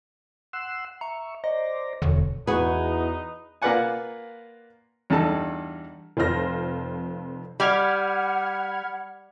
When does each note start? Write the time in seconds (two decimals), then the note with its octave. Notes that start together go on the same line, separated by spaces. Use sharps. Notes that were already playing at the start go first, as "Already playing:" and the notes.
0.53 F#5 C6 E6
1.01 E5 A#5 C#6
1.44 C5 D5 D#5 A#5
2.02 E1 D2 D3 C#5
2.47 E2 D#4 F#4 G#4 B4
3.62 A#3 F4 B4 D5 F#5 G#5
5.10 E2 G2 D#4 A4 A5
6.17 F1 F2 F4 C5 F6 A#6
7.60 G3 F#5 B5 F6 G#6